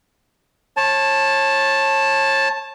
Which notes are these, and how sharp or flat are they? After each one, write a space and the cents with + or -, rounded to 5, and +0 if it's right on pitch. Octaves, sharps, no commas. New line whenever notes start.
C#5 -30 A5 +0